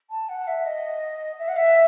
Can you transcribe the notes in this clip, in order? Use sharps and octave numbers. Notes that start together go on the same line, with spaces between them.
A5
F#5
E5
D#5
E5
F#5
E5